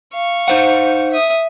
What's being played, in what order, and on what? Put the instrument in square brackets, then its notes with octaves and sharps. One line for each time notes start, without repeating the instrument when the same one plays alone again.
[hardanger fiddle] F5 C#6
[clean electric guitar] D#4 C5 F#5
[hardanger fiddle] E5 D#6